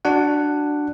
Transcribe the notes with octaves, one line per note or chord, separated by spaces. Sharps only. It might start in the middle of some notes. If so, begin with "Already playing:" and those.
D4 F#4 F#5